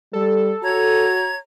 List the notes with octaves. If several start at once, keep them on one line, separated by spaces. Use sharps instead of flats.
G3 A4
F#4 C#5 A#5 G#6